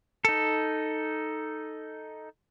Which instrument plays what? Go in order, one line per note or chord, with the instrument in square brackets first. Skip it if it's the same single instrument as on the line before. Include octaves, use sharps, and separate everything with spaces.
[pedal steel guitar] D#4 A4